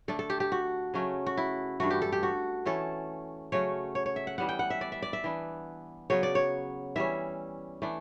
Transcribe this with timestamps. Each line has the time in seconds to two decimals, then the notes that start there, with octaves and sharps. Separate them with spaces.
0.08 D3 A3 D4 A4
0.19 A4
0.30 G4
0.40 G4
0.52 F#4
0.94 C#3 F#3 A3 C#4
1.26 F#4
1.37 E4
1.80 G2 E3 A3 F#4
1.90 G4
2.02 A4
2.12 G4
2.23 F#4
2.65 E3 A3 C#4 A4
3.52 C#3 F#3 A3 C#4 C#5
3.95 C#5
4.06 C#5
4.16 E5
4.27 F#5
4.38 E3 G3 B3 F#5
4.49 G5
4.59 F#5
4.70 E5
4.81 D5
4.92 E5
5.02 D5
5.13 E5
5.24 E3 B3 D4
6.10 C#3 F#3 B3 C#5
6.23 D5
6.35 C#5
6.96 E3 G3 C#4 E5
7.82 E3 A3 D4